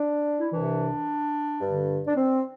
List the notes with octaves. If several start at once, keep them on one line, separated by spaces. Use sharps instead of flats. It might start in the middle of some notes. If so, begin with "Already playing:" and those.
Already playing: D4
E4
C2 C3 E3 D4
G2 D3
D4
C4